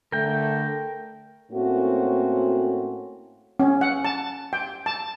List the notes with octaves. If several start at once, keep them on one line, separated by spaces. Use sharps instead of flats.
D3 A3 A#4 G5
A2 A#3 C4 C#4 F#4
C#4
F#5
A5
G5
A5